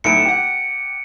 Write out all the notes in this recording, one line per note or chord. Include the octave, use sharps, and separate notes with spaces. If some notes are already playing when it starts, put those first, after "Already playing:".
B1 A2 A3 C#7 D7
G4 F#5